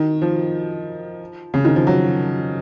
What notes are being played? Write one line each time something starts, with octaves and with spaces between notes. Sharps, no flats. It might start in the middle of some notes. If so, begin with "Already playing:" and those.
Already playing: D#3
F3
C#3
D#3
F3
F#3